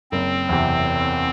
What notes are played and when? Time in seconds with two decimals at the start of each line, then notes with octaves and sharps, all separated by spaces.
0.11 F#1 C4
0.49 E2 C3